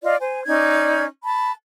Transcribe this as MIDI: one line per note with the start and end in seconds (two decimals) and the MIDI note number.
0.03 0.15 65
0.03 0.15 74
0.03 0.15 75
0.21 0.43 72
0.21 0.43 80
0.46 1.05 61
0.46 1.05 63
0.46 1.05 74
0.46 1.05 92
1.23 1.51 81
1.23 1.51 83